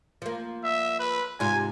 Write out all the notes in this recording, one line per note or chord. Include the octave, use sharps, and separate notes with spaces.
F3 A#3
E5
B4
G#2 C3 F4 G#5